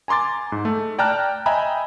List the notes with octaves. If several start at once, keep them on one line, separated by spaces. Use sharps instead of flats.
G#5 A#5 C6 D6 A6
G#2
A3
D5 G5 A5 A#5 F6 F#6
D#5 E5 G5 G#5 A#5 B5